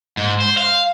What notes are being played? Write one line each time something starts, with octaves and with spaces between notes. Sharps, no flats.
G#2
C5
F5